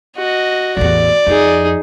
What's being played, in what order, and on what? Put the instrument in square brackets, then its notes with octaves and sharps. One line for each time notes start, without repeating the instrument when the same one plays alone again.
[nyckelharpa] F#4 [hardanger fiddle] D#5
[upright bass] A1 E2 [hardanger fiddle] D5
[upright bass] F2 [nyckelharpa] D#4 G#4